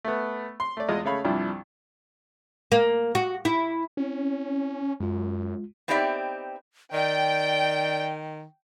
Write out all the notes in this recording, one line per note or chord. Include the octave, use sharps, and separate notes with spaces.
A3 B3
C6
A3 D5
E2 G#3 F4 D#5
C#3 A3 C#5 F5 B5
C2 G2 F3 D4 E4
A#3
F#4
E4
C4 C#4 E4
F#2 G#3 F4
B3 C4 D#4 G4 D5 E5
D#3 D5 G5